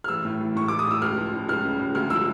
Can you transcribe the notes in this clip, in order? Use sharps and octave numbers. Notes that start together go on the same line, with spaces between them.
F6
A1 E6
A2
A1
A2 C#6
A2 D6
D#6
A2 E6
C#2 F6
F3
C#2
C#2 F6
C#3
C#2
D2 F6
F3 E6